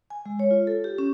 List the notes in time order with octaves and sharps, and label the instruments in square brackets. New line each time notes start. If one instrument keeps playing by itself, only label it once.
[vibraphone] G#5
G#3
C#5
F4
A4
G4
C#4